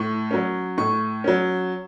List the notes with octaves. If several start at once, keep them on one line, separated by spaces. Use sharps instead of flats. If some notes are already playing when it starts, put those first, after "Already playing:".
Already playing: A2 C#6
F#3 C#4
A2 C#6
F#3 C#4